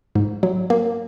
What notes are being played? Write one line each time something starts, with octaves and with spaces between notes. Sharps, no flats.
G#2
F#3
A#3